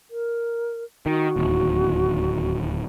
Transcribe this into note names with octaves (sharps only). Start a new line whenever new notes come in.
A#4
D#3 F#4
D1 D#2